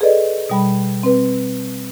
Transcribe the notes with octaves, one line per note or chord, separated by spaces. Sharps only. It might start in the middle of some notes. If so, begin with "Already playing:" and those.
G#4 A4 B4 D5 D#5
B2 G3 B5
C4 B4